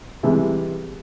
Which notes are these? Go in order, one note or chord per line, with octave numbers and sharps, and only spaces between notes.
C3 E3 G3 G#3